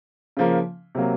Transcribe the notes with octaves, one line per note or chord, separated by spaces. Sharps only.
C#3 F3 A#3
C3 F#3 A#3